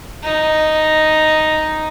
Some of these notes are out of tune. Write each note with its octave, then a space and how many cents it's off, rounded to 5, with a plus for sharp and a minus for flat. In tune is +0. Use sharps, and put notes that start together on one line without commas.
D#4 +0